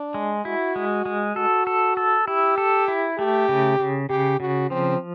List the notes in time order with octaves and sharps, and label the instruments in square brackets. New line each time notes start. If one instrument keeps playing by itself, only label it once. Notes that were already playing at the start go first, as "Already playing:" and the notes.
Already playing: [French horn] D4
[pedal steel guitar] G#3
[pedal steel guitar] E4 [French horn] F#4
[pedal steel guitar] G#3
G#3
[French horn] F#4 [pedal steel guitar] A4
[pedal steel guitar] A4
A4
[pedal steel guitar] E4 [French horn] G4
[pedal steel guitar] A4
E4
[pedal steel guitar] A3 [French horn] G4
[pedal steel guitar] C#3
C#3
[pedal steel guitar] C#3 [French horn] G4
[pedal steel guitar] C#3 [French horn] F#4
[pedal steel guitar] F3 [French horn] C4